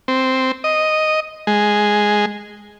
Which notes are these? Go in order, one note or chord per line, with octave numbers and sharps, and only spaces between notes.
C4
D#5
G#3